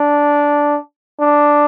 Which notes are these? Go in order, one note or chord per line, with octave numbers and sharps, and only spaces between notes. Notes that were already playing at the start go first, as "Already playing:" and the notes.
Already playing: D4
D4